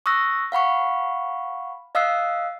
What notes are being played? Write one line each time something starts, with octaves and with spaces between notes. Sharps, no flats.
C#6 D#6 E6 F#6 A#6
F5 F#5 B5 C#6
D#5 F5 D#6 E6 F#6 C7